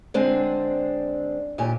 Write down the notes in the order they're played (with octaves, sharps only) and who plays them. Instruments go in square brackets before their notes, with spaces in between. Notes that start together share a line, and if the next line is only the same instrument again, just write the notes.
[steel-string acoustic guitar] D3 G#3 C4 D4
D#2 A#2 G4 G#5